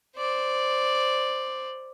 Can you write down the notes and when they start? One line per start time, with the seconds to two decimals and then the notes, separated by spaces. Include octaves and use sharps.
0.16 C5 D5